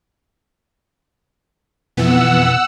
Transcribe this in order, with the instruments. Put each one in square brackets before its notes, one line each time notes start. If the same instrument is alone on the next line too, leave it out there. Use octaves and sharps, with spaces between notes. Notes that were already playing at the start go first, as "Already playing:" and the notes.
[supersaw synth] F2 E3 B3 [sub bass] B2 [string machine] F#5 E6